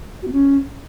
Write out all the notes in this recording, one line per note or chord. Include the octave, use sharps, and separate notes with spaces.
F#4
B3
C#4